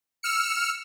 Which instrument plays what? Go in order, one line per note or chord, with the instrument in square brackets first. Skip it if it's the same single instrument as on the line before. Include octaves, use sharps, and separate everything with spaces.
[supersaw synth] E6 F6 C#7